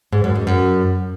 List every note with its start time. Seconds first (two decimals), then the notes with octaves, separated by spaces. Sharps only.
0.12 G#2
0.24 F#2
0.35 G#2
0.47 F#2